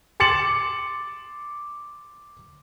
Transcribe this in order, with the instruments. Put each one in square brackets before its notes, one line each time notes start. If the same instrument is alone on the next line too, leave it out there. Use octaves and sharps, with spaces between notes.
[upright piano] C6 D6 A6 C#7 E7 F#7